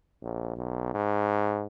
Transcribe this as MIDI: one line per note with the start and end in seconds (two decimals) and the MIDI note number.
0.23 0.52 34
0.57 0.91 35
0.94 1.67 44